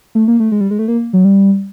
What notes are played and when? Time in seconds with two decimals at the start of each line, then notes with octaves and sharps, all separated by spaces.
0.15 A3
0.28 A#3
0.40 A3
0.52 G#3
0.61 G3
0.71 G#3
0.79 A3
0.88 A#3
1.13 F#3
1.25 G3